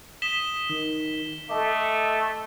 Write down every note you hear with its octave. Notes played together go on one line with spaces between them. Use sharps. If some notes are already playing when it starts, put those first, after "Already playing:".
D#6 B6 E7 G7
D#3
A3 A4 D#5 A5 D6